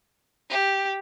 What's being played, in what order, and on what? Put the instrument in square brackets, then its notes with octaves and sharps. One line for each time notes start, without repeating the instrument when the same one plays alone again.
[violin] G4